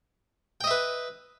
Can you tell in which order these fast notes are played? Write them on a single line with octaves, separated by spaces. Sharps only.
G5 D#5 E5 B4